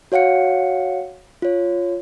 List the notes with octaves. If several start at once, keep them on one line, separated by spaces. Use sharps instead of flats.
F#4 C#5 F5 F#5 C#7
F4 C#5